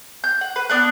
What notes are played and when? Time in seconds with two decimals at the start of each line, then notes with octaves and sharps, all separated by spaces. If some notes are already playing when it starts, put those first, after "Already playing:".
0.24 G6
0.41 F#5
0.56 B4
0.70 B3 D4 F#6